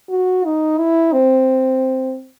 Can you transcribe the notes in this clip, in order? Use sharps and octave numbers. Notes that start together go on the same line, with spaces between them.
F#4
D#4
E4
C4